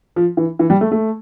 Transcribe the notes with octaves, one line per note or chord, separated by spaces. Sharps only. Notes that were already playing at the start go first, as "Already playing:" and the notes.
F3
E3
E3
G3
A3
A3